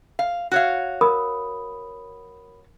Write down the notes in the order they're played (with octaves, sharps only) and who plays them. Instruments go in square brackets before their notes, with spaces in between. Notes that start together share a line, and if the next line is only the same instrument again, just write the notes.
[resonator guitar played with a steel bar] F5
F#4 C#5 F5
[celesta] A#4 B5 D#6